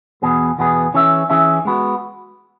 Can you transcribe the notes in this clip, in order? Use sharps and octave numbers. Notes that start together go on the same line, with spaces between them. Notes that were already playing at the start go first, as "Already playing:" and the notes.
E2 B2 B3 G#4
E2 B2 B3 G#4
E3 C#4 G#4 E5
E3 C#4 G#4 E5
G#3 B3 F#4